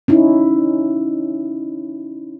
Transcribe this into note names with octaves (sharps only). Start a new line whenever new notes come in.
C#4 D#4 E4